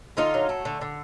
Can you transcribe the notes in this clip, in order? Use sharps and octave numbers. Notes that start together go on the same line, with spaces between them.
D3 D#4 F4
F#3
A3
D3
D3